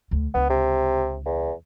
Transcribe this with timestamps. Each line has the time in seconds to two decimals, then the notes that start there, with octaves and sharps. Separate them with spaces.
0.11 D2
0.34 C#2 B3 D4
0.50 C3
1.26 E2